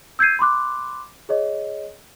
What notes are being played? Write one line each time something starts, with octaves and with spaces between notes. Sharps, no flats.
E6 G6 G#6 C7 D#7
B5 C6 D6 F#6
G#4 C#5 D#5